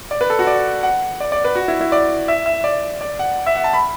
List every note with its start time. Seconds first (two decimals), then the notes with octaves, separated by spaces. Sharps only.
0.11 D5
0.21 B4
0.30 A4
0.39 F#4
0.47 D5
0.83 F#5
1.20 D5
1.32 D5
1.45 B4
1.55 F#4
1.68 E4
1.81 E4
1.92 D5
2.28 E5
2.46 E5
2.64 D5
3.01 D5
3.19 F#5
3.46 E5
3.55 F#5
3.64 A5
3.73 B5